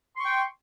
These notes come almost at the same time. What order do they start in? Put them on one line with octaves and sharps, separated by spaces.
C6 C#6 G5